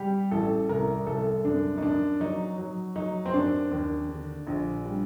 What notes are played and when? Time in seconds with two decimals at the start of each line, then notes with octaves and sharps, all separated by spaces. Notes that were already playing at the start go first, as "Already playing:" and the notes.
Already playing: G3 G4
0.31 A1 A4
0.69 C2 A#4
1.07 C2 A4
1.45 F#2 D4
1.78 D#4
1.82 F#2 D4
2.20 F#3 D#4
2.58 F#3
2.96 F#3 D#4
3.26 C4
3.34 F#2 D4
3.72 D#2
4.09 D3
4.47 A#1
4.85 G3